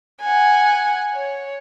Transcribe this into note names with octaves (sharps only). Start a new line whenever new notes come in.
F#5 G#5
C#5